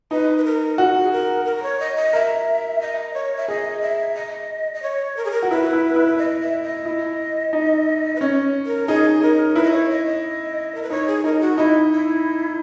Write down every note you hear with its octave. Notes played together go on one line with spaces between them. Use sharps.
D#4 B4
B4
A#4
F#4
G#4
A#4
A#4
C#5
D#5
D#5
A#4 E5
D#5
C#5
E5
G#4 D#5
E5
D#5
D#5
C#5
A#4
G#4
A#4
F#4
E4 B4
E4
E4
D#5
E5
D#5
E4
D#4
B4
C#4 C#5
A#4
D#4 G#4
D#4 A#4
E4 B4
D#5
C#5
D#5
D#5
A#4
B4
D#4 C#5
G#4
D#4 A#4
F#4
D#4 E4
E4